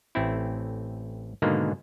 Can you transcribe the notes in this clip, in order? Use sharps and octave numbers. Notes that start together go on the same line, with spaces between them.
A1 A3 C4 E4
G#2 B2 D3 D#3 G#3 A#3